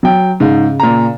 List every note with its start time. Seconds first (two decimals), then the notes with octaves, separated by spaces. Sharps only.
0.03 F#3 G5
0.40 G#2 C#3
0.80 A#2 A#5